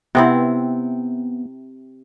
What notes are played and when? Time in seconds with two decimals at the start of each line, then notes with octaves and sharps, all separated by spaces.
0.15 C3 B3 C4 E4